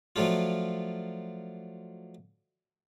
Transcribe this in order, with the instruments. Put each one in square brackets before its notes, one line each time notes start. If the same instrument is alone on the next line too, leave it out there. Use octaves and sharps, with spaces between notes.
[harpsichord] F3 F#3 A3 D4 F4